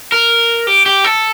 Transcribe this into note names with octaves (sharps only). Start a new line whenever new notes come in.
A#4
G4
G4
A4